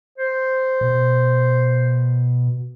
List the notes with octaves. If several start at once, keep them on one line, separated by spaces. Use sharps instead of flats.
C5
B2